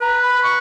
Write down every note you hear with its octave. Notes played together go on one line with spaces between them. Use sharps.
B4 A#5
B5
C#6